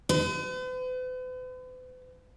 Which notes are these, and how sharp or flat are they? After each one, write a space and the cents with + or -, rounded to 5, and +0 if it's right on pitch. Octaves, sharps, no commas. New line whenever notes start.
B4 +45